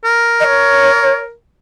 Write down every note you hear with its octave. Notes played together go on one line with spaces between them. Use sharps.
A#4
D#5
C#5